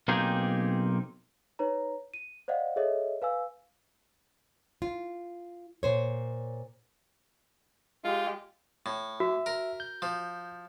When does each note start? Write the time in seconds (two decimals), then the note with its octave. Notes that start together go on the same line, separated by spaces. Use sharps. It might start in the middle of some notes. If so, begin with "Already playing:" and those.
0.08 B1 A#3 C4 D#4 G4 G#4
1.59 D#4 B4 C#5 A#5
2.14 D#7
2.48 C5 D5 D#5 F5 F#5
2.76 G#4 A4 C#5 D#5 E5
3.22 B4 F5 G#5 E6
4.82 F4
5.83 A#2 C5 C#5
8.04 G#3 F4 G4
8.86 A2
9.20 F#4 E5
9.46 A#4
9.80 G6
10.02 F3